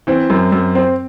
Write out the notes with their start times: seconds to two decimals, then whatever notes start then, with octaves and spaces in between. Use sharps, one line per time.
0.07 E3 C4
0.30 F#2
0.52 F#2
0.75 C4